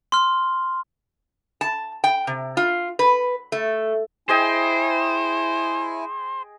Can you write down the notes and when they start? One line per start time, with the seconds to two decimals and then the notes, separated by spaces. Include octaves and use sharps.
0.12 C6 F6
1.61 A5
2.04 G5
2.27 C3
2.57 F4
2.99 B4
3.52 A3
4.29 E4 G#4 C5 D#5 G5 G#5